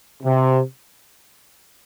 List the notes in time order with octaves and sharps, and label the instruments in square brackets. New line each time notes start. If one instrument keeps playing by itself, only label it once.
[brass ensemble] C3